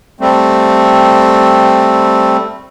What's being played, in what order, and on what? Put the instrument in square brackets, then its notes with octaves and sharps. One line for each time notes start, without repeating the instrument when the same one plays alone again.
[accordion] G3 A3 C4